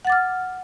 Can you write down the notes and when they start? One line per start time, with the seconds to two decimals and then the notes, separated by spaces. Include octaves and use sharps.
0.05 F#5
0.07 A6
0.10 D6
0.12 F6